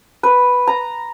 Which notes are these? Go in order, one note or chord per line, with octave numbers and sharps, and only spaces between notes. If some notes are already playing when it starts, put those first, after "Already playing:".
B4
A#5